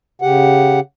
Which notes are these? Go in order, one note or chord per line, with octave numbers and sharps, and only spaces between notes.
C#3 G4 F#5